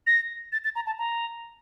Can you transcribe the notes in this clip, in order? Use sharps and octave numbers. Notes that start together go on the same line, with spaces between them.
A#6
A6
A6
A#5
A5
A#5